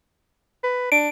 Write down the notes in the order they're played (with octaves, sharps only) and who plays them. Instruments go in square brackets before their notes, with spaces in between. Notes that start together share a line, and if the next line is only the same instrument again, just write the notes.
[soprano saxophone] B4
[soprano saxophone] D4 [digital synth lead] D7